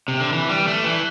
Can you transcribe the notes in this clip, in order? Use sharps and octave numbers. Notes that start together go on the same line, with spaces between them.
C3
D3
E3
G3
A3
E3